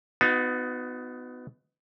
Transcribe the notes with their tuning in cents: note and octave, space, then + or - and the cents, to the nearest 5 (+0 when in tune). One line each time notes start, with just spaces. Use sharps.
B3 +20 D#4 +0 F#4 -35